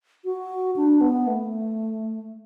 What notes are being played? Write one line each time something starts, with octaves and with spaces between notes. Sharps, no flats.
F#4
D4
B3
A3